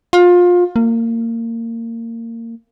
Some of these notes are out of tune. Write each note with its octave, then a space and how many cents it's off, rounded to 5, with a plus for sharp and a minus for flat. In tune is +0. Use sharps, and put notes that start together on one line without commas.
F4 +25
A#3 -25